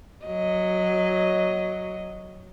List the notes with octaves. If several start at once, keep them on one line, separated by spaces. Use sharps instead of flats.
F#3 D#5